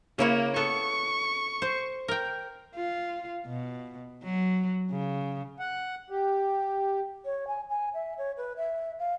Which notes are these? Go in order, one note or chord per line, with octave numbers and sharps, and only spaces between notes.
C#3 A#3 E4 C#5
B3 A4 C#6
C5
A#4 G5
F4
B2
F#3
C#3
F#5
G4
C#5
G#5
G#5
E5
C#5
B4
E5
F5